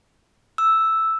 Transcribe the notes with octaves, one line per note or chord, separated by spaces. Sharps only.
E6